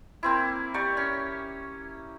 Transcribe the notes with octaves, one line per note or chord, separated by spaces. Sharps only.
A#3 C4 E4
G4 D5 A#5 C#6
C#4